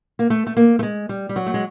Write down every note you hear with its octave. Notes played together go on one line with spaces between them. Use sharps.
A#3
A3
A3
A#3
A3
G#3
G3
G3
F#3
A3
G#3